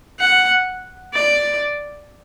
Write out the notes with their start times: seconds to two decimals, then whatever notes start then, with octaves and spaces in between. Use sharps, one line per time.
0.20 F#5
1.14 D5